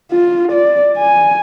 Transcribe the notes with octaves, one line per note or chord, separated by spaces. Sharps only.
F4
D5
G#5